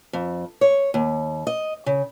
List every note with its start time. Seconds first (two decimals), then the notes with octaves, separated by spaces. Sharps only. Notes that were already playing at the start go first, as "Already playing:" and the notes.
0.13 F2
0.61 C#5
0.94 D#2
1.47 D#5
1.86 C#3